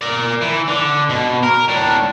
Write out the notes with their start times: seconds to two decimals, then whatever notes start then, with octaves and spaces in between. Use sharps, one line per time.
0.01 A#4 D5
0.42 E3
0.68 D3
1.10 B2
1.43 A#4
1.69 A2 D4